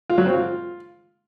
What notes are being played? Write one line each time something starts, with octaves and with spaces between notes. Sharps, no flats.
F4
F#3
C4
F4